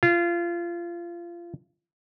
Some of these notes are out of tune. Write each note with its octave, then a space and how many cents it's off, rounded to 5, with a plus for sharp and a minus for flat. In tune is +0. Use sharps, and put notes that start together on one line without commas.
F4 -25